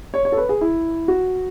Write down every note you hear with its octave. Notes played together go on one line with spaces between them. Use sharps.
C#5
C#5
A4
B4
G#4
E4
F#4